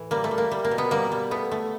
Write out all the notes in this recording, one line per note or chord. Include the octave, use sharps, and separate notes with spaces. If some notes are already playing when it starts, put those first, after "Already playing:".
Already playing: A2 E3
G3 A#3
A3
G3
A#3
G3
A#3
B2
B3
G3 A#3
G3
A3 B3
A3